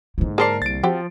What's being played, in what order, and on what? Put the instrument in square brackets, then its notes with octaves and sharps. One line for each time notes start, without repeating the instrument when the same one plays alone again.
[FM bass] G#2 [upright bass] D3 A#3
[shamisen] G#4 C5 D5 [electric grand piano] A#4 A5 C7
[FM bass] C2 [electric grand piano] A6 D7
[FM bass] F3 [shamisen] C4 F#4 G4